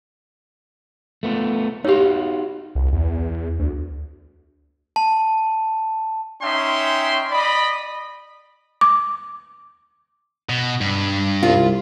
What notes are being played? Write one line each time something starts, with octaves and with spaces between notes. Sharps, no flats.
A3 B3 F4
D#4 F#4 G4 C#5 F5
C2
E2
D2
A5
C#4 D#4 E5 G5 C6
D5 D#5 B5
D6
B2
G2
C2 F4